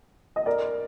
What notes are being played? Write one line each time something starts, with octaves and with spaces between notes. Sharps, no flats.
D#5
A#4 D5